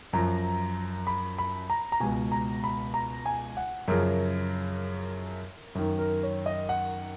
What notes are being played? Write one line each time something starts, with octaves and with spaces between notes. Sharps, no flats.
F#2 F3 A#5
B5
B5
A#5
A#5
C#2 B2 G#5
A#5
B5
A#5
G#5
F#5
F#2 C#3 F3 A#4
F#2 D#3
A#4
C#5
D#5
F#5